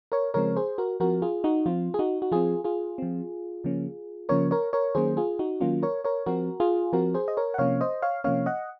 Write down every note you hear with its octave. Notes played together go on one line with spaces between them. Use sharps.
A#4 C#5
C#3 F3 G#3 C4 A#4 C#5
G#4 C5
F#4 A#4
F3 C4 F#4 A#4
F4 G#4
D#4 F#4
F3 C4 F4
G#4
D#4 F#4
F#4
F3 C4 F4 G#4
F4 G#4
F3 C4
C#3 F3 A#3 C#4
C#3 F3 A#3 C#4 A#4 C#5
A#4 C#5
A#4 C#5
D#3 F#3 A#3 C#4 G#4 C5
F4 G#4
D#4 F#4
D#3 F#3 A#3 C#4 F4
A#4 C#5
A#4 C#5
F3 C4 F#4 A#4
F4 G#4
F3 C4 F#4 A#4
G#4 C5
D#5
A#4 C#5
F#5
C3 F3 A#3 C#4 C#5 F5
C5 D#5
C#5 F5
C3 F3 A#3 C#4 C#5 F5
D#5 F#5